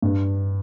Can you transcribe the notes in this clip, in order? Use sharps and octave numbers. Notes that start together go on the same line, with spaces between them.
G2